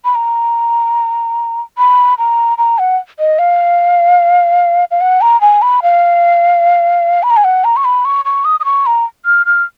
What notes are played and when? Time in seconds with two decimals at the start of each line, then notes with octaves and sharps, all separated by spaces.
0.05 B5
0.15 A#5
1.78 B5
2.18 A#5
2.58 A#5
2.79 F#5
3.19 D#5
3.39 F5
4.91 F5
5.01 F#5
5.21 A#5
5.41 G#5
5.62 B5
5.83 F5
7.23 B5
7.30 A#5
7.37 G#5
7.44 F#5
7.64 A#5
7.77 C#6
7.85 B5
8.05 C#6
8.25 C#6
8.45 D#6
8.60 D#6
8.65 C#6
8.86 A#5
9.26 F6
9.46 F6